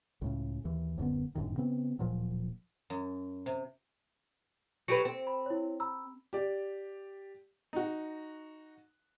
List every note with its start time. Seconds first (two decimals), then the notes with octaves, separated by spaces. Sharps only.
0.22 C#2 A2 C#3
0.65 D#2 E3
0.98 D1 F#2 D3 B3
1.35 G1 F#2 A2 D#3
1.58 C#3 B3 C4
1.99 D1 A#2 F3 F#3
2.90 F#2
3.46 C3
4.88 F#3 G4 B4 C#7 D7
5.05 C4
5.27 B5
5.46 E4 C#5
5.80 A#5 B5 E6
6.33 G4 D5
7.73 D#4 F#4